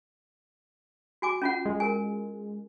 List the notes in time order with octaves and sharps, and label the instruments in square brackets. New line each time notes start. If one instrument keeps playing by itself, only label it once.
[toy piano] F#4 G#5 D6
C#4 F4 F#5
[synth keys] G#3
[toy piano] A#4 G#5